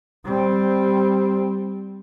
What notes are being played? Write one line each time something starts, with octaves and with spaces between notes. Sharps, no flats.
G3 C4